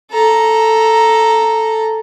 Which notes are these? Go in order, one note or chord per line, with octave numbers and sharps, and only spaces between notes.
A4 A#5